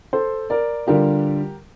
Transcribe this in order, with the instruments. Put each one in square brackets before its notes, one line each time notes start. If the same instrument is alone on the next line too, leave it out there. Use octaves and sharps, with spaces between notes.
[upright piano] A4 C5
A#4 D5
D3 G3 D4 F4 G4 A#4